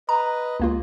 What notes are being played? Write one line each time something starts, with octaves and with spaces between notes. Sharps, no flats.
B4 D#5 A#5
C#2 A#3 F4